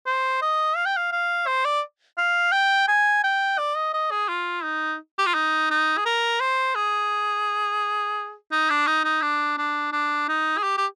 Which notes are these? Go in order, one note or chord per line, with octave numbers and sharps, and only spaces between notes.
C5
D#5
F5
G5
F5
F5
C5
D5
F5
G5
G#5
G5
D5
D#5
D#5
G#4
F4
D#4
G4
F4
D#4
D#4
G#4
A#4
C5
G#4
D#4
D4
D#4
D#4
D4
D4
D4
D#4
G#4
G4
G4